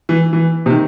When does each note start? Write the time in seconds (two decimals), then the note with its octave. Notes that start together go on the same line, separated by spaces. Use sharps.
0.09 E3
0.33 E3
0.66 C3
0.70 D#3